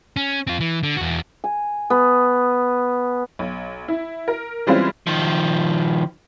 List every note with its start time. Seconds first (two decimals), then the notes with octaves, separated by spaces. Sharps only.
0.17 C#4
0.47 C4 F4
0.60 E3
0.83 D3
0.97 E2 F#4
1.44 G#5
1.90 B3
3.39 B1
3.88 E4
4.28 A#4
4.67 E3 G3 G#3 C4 C#4 F4
5.07 D#3 F3